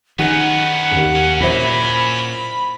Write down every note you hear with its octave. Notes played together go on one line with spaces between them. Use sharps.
D#3 B3 C#4 D#4 G#4 F#5
D#2 G#2
F#3 C#4
A#2 E4 C5 E5 B5